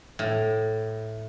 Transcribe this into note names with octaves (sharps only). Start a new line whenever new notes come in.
A2